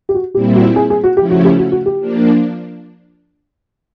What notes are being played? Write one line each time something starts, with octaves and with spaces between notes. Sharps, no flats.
G4
F#4
A#2 G3 C4 E4 G4
F#4
G#4
G#4
F#4
C#3 F3 A3 C#4 E4 G4
F#4
G4
F#4
F#4
G4
F3 A#3 D4